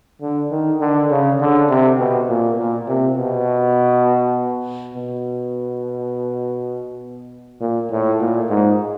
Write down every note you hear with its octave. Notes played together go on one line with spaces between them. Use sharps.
D3
D#3
D3
C#3
D3
C3
B2
A#2
A#2
C3
B2
B2
A#2
A2
A#2
G#2